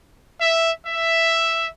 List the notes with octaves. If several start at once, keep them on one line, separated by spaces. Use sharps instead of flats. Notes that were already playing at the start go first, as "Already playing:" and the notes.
E5
E5